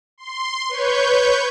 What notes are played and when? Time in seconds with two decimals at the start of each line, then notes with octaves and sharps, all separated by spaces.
0.18 C6
0.69 B4 C#5 C#6 G6